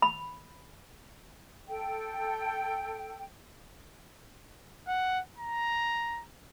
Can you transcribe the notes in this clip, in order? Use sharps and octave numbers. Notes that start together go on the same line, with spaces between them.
B5
A4 G5
F#5
A#5